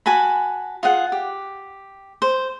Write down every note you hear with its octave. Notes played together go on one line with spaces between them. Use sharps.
F#4 G#5 A5 B5
F4 G#4 F#5
G4
C5